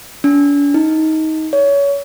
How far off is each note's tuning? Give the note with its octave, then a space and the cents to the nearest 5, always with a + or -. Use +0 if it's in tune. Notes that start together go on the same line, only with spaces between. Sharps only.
D4 -45
D#4 +20
C#5 +25